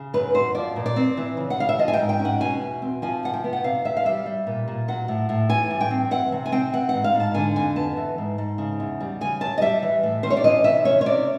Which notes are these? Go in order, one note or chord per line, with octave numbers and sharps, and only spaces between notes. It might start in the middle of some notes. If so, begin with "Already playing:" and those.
Already playing: C#3
F#2 B4
F#2 C5
F3 D5
A#2
D5
C4
E3
C#3
F#5
C#3 F5
E5
F3 D#5
G#5
G5
G#2
G5
C#4
F#5
B2 G#5
E2
C4
F3 G#5
C3 F#5
G5
B3
F#5
C3 F5
E2 E5
F5
G3 E5
G3
A#2
A#2
F#3 F#5
A2
A2
E3 G#5
G2
G5
C4
E3 F#5
C3
G#5
C4 G5
E3 F#5
F#5
G#2
F5
G#2
A5
D3 G#5
F2 G#5
B3 A5
E3
G#2
G#2
C#3
E2
G3
C#3 G#5
F#2 A5
D#5
G3 E5
E3
A2
C#4 C5
C#5
D5
E3 D#5
C3 E5
C#4 C#5
C#5
C3 D5